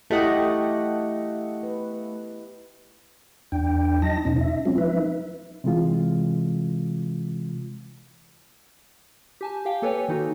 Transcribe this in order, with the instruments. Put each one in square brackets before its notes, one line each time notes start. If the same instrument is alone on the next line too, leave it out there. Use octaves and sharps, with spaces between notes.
[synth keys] A3 F#5 [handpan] E4 G4 D#5
[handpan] B4
[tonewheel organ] E2 D4 G5
F#3 D#4 D#5 A5 A#6
E2 B2 C#4 D#4
E5
F#3 G#3 C4 C#4 F4
F3 D#4 B4 E5
[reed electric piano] C3 E3 G#3 F4
[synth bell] G4 G#5 A5
G4 F5 G5
A#3 A4 B4 C#5 G5 G#5
D#3 D#4 F#4